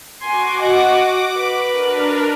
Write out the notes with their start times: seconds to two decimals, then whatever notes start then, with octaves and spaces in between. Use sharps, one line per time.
0.22 F#4 G#5 C6 D6
0.61 D#5 F#5
0.91 D6
1.37 B4
1.70 D4 A#4